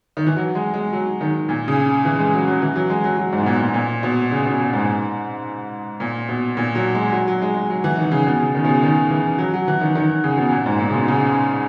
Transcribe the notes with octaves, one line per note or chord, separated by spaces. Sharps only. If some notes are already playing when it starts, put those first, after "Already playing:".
D#3
E3
F#3
G#3
G#3
F#3
D#3
A#2
C#3
E3
G#3
F#3
F#3
E3
F#3
G#3
F#3
F#3
G#2
B2
A#2
A#2
A#2
B2
C#3
B2
A#2
G#2
A#2
B2
A#2
F#3
G#3
F#3
F#3
G#3
G#3
F#3
E3
D#3
C#3
B2
C#3
D#3
B2
C#3
D#3
E3
F#3
F#3
E3
D#3
D#3
C#3
B2
A#2
G#2
A#2
C#3
B2
C#3